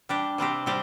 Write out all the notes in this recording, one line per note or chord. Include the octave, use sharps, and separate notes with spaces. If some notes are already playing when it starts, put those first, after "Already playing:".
G3 D4 G4
C3 G3 C4 G4
C3 G3 C4 G4